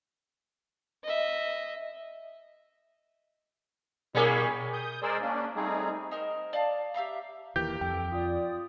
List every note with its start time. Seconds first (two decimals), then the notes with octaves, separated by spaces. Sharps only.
1.04 D#5 E5
4.15 B2 G3 A#3 C#4 E4 G#4 A#4
4.73 D#6 G6
5.02 G#3 G#4 A#4 C5 D5 E6
5.22 A#3 C#4 D4
5.56 G3 A3 C4 D#4 G#4
6.11 D#4 A#4 C5
6.53 D5 F5 A5
6.94 G4 E5 F5 A#5
7.56 D#2 E3 G4 A#4 G6
7.81 F2 A4 G5
8.12 F4 D5 D#6